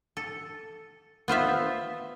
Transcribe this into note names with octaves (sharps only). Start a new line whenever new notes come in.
A4
B3 F4 C5 E5